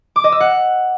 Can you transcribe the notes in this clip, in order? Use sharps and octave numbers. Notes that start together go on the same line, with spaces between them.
D6
D#5
E6
F#5